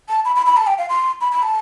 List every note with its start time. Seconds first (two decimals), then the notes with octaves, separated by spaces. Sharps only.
0.09 A5
0.25 B5
0.36 B5
0.46 B5
0.57 A5
0.67 G5
0.78 F5
0.89 C6
1.21 B5
1.32 B5
1.43 A5